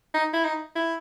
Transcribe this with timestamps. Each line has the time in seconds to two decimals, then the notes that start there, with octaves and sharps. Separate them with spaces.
0.14 D#4
0.33 E4
0.45 D#4
0.76 E4